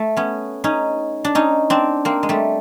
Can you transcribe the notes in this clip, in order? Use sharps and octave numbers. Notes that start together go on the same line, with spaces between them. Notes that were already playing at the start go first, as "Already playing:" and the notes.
Already playing: A3
B3 C#4
C#4 D#4
D4
C#4 D#4
C4 D4
A#3 C4
G#3
G3 A3